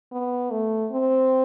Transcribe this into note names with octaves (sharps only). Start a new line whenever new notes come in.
B3
A3
C4